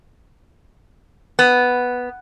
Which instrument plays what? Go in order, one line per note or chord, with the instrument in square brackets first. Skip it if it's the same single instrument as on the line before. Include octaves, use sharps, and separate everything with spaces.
[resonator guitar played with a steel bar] B3